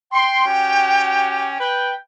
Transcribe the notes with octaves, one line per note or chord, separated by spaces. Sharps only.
G5 C6
C#4 F#4 G4
B4 G5